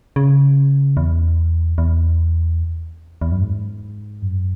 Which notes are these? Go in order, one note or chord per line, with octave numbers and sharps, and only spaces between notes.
C#3
E2
E2
E2
F#2
G#2
F#2